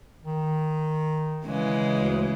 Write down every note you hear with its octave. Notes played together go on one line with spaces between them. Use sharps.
D#3
C#3 E3 G#3
D2